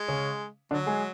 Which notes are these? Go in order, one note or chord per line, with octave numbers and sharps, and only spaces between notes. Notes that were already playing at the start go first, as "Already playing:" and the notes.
Already playing: G#3
C#3 C#4
D3 F#3 D4
G#3 G#4